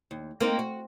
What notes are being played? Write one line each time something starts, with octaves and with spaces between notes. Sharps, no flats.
D#2
A#3 C4 D#4
F#4